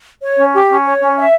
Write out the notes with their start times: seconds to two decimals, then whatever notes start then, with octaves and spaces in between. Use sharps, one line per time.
0.22 C#5
0.38 C#4
0.53 G4
0.70 C#4
0.85 C#5
1.01 C#4
1.17 E5